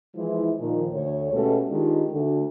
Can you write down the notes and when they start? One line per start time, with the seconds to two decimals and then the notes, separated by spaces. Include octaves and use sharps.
0.15 E3 F3 G#3 E4
0.59 A#2 D#3 F3
0.92 D2 C#5
1.32 B2 G#3 A3 C#4 G4 A4
1.70 D#3 G#3 D4 D#4 F4 G4
2.12 D2